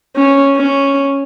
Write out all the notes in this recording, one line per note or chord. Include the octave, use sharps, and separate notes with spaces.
C#4
C#4